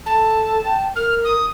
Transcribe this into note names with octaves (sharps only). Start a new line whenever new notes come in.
A4 A5
G5
A#4 F6
D#6